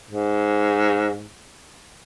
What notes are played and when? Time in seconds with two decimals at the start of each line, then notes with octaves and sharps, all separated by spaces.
0.11 G#2